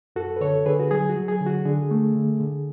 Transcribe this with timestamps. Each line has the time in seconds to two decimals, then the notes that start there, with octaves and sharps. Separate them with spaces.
0.16 F#2 F#4 A4
0.36 B4
0.41 D3 A4 C#5
0.66 D3 G#4 B4
0.80 F#4
0.91 F#3 G#4
1.09 F#4
1.16 F#3
1.28 G#4
1.41 D3
1.46 F#4
1.65 D3 G#4
1.91 A3
2.15 D3
2.40 D3